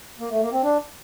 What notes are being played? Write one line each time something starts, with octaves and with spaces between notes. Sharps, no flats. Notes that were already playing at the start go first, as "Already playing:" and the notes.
A#3
A3
A#3
C4
D4